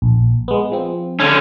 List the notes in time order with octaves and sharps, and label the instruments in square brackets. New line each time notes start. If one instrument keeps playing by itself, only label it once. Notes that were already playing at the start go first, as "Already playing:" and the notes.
[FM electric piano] A#1
G#3 B3
F3 C4
[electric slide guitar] D3 C#4